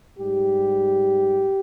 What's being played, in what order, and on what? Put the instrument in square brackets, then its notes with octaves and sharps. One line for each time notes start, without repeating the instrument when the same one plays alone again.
[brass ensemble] G#2 G3 G4